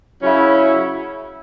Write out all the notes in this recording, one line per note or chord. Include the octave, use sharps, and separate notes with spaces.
C#3 F#3 C#4 E4